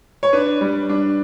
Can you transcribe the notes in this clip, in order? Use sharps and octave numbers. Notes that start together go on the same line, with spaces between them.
C#5
D4 B4
G3
D4